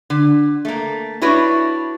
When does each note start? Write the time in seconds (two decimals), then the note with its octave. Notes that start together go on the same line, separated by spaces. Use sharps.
0.10 D3
0.65 A3 A#3
1.22 D4 E4 F#4 B4 C#5 E5